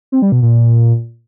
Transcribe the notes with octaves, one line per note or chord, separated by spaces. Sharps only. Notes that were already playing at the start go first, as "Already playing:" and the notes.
C4
G3
B2
A#2